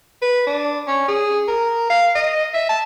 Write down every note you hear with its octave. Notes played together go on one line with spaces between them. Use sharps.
B4
D4
C#4
G#4
A#4
F5
D#5
E5
A5